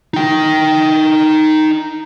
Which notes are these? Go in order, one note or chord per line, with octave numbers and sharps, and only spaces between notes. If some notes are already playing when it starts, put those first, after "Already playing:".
D#4 G5